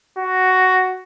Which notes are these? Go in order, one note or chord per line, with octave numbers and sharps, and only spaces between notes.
F#4